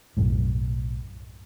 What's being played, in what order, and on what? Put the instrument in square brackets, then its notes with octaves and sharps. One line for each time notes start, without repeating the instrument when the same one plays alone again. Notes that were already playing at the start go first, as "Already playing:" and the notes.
[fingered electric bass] B1 F#2 A2